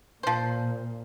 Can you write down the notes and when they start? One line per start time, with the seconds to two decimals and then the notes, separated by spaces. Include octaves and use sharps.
0.23 A#2 F3 C5